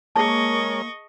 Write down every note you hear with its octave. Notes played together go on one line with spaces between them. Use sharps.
G#3 A#3 G#4 A#4 C#5 D#5 A5 C#6